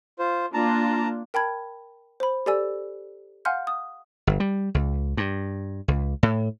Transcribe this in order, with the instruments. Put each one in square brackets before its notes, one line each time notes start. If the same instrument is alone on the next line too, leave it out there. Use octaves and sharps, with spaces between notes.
[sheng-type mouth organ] F4 C5
[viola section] A#3 D4 F4 [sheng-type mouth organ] A5 A#5
[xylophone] A#4 G5 A5 B5 G#6
C5 B5
G4 A4 D5 G#5 E6
F5 F#5 G#5 C6 F6 G6
D#6
[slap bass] G1
G3
C#2
G2
C#2
A2